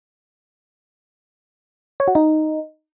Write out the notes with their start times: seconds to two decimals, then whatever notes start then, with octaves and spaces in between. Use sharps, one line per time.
2.00 C#5
2.08 F#4
2.15 D#4